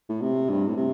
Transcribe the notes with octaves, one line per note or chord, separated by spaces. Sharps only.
A2
C3
G2
A2
C3